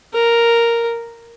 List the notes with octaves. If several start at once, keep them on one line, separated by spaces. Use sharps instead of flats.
A#4